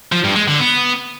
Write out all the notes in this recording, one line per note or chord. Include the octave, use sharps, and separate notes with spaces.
F3
G2
G#3
D3
B3